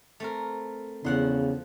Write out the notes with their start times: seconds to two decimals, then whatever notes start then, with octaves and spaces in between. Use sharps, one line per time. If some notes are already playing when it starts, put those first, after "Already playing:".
0.20 A3 C4 A#4
1.04 E2 C#3 F3 F#5 C6